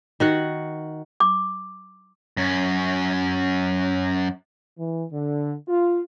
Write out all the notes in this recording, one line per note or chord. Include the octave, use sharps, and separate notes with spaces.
D#3 F#4 F#5
D6
F#2 C#4
E3
D3
F4